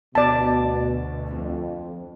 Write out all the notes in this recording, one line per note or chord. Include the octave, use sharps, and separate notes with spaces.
D2 B2 D5 A5
F2